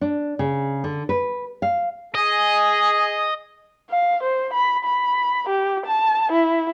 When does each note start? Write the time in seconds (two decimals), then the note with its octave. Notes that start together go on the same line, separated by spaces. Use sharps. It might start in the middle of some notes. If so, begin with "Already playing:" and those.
0.01 D4
0.39 C#3
0.84 D3
1.09 B4
1.62 F5
2.15 G#4 D#5
3.91 F5
4.23 C5
4.54 B5
4.85 B5
5.49 G4
5.86 A5
6.31 E4